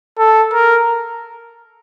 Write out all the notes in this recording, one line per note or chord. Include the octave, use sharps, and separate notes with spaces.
A4
A#4